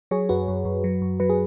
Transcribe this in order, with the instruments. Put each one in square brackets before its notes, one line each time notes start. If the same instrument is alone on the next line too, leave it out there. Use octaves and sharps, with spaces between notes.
[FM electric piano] F#3 G#4 C#5
F#2 F#4 B4
F#2
F#2
F#3
F#2
F#3 B4
G#4